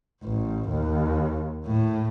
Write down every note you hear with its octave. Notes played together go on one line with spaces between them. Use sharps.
A1
D#2
A2